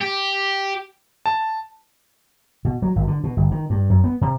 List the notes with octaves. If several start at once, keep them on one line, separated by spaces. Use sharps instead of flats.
G4
A5
B2
F#3
G#1
D3
B2
G1
D#3
G2
F#2
B3
C3